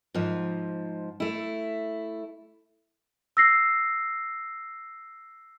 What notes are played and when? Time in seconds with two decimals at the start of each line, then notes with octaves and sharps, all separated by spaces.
0.14 G#2 F3
1.20 A3 E4
3.37 E6 A#6 C7